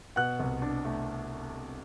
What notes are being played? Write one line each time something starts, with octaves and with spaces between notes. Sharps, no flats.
B2 F#5 F#6
C2
D4
A3